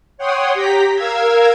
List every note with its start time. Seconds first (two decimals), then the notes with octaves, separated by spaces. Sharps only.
0.18 C#5 F#5 G5 C6 D#6
0.54 G4 G5 A#5 B6
0.95 A#4 F5 E6 G#6